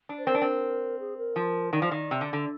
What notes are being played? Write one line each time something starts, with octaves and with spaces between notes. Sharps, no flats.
D4
C5
C4 A#4
D4
C4
G#4
A#4
F3
D#3 D5
F3
D#3
C3
D3
D3